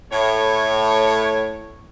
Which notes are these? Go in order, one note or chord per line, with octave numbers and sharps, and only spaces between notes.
A2 C#5